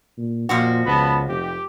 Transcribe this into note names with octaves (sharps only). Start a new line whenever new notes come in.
A#2
F2 A#2 F3 F#4
C#2 B3 A5 B5
F1 G4